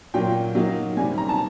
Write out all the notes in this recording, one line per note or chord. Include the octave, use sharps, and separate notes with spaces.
A#2 F#3 A#3 G5
F#3 A#3 D#4
C3 D#3 G3 G#5
A#5
A5